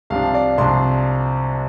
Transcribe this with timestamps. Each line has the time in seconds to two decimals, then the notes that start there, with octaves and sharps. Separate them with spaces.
0.10 C2 C3 F3 D4 F5
0.34 D5
0.58 C2 C3 F3 D4 C6